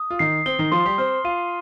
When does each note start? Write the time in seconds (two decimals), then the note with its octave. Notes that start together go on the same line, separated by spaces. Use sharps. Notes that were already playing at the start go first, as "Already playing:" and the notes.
Already playing: D#6
0.10 F4
0.19 D#3 D#4 C7
0.46 C4 G7
0.59 D#3 D#4
0.72 F3 F4 C6
0.85 G3 G4
0.98 C4 C5 F6
1.24 F4 F5 D#7